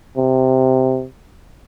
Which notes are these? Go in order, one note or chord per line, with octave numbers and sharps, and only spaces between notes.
C3